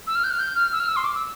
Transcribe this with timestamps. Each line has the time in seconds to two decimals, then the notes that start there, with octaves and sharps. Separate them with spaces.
0.07 E6
0.15 F6
0.24 G6
0.31 F6
0.39 G6
0.55 F6
0.72 E6
0.80 F6
0.88 E6
0.96 C6
1.04 D6
1.15 E6